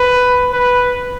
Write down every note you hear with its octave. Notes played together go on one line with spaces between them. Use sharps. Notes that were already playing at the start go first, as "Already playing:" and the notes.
Already playing: B4
B4